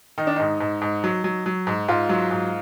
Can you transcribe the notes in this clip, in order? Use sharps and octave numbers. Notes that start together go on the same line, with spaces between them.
D#3 D#4
D4
G#2 D#4
G#2
G#2
F#3
F#3
F#3
G#2
G#2 F4
F#3
G#2